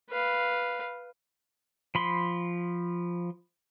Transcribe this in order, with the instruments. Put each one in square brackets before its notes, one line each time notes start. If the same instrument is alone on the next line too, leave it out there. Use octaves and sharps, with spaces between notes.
[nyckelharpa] B4 F5
[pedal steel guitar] F3 B5 C6